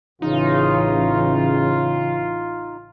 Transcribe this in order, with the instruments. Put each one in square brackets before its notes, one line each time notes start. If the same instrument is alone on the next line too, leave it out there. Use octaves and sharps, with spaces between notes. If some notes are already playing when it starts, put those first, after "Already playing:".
[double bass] A1 E3 [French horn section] C#3 [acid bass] D#4 [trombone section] F4